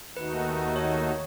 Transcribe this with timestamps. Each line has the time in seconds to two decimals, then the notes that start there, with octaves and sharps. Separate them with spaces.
0.16 D#2 D#3 A3 D#4 F#4 B4
0.76 C#5